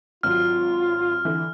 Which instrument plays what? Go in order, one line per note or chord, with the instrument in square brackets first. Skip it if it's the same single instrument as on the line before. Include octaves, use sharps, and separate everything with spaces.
[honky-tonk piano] G#1 F#3 [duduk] F4 [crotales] F6
[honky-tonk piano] D3 E3